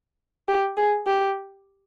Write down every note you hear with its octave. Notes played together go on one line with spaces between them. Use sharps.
G4
G#4
G4